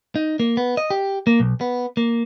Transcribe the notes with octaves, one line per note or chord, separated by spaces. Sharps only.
D#4
A#3
B3
D#5
G4
A#3
B1
B3
A#3